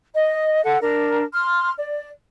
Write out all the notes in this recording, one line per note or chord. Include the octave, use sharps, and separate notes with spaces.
D#5
A4 F#5
D4 A#4
C6 F6
D5